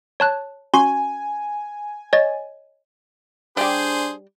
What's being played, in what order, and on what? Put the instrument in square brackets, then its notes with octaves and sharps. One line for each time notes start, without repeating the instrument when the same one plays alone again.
[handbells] C#5 A5 F#6
[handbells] C#4 F#4 C6 [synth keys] G#5
[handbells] C#5 D#5 A6
[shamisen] G3 G4 [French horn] D4 [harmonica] G#4 C5